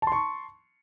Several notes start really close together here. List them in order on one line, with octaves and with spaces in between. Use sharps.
A5 C6 C#6